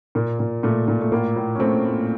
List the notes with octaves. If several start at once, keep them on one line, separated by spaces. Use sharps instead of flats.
A#2 A#3
A#2
A#2 A3
A#2
A3
A2 A#3
A2
C#4
A2 A3 C4
A2